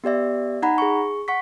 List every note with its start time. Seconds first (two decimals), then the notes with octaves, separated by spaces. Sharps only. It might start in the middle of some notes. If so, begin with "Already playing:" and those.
0.04 B3 G4 D5 E5
0.62 D#4 F#5 A#5 B5
0.78 G#4 C#6
1.28 F#5 C#6 B6